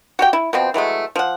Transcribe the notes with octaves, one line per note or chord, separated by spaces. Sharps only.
F#4 G4 G5
E4
B2 F3 C4
E3 F#3 G#3 A3
F3 F#5